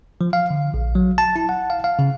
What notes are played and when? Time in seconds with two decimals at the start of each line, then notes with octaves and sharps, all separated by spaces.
0.21 F3
0.33 F5
0.50 D3
0.74 A#1
0.95 F#3
1.18 A5
1.36 E4
1.49 F#5
1.70 F5
1.84 F5
1.99 C#3